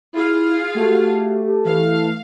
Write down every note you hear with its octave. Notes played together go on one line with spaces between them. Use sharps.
E4 F4 G#4 F5
A3 F#4 G4
E3 F5